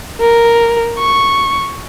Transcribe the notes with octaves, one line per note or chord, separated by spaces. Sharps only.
A#4
C#6